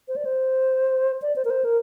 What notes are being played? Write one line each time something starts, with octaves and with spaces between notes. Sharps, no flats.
C5
D5
C5
D5
C5
A#4
C5
A#4